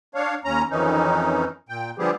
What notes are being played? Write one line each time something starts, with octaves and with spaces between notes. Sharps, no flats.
D4 C#5 F5
D#2 C#4 A#5
F2 D#3 E3 C#4 D#4
A#2 G5
D3 F3 G3 B3 G4 G#4